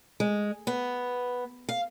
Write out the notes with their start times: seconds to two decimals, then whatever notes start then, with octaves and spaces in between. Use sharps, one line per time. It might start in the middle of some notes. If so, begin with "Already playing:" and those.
0.20 G#3
0.67 B3
1.69 F5